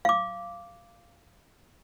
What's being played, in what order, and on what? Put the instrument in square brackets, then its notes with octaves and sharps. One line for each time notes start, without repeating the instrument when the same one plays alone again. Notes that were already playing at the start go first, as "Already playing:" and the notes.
[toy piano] F5 D6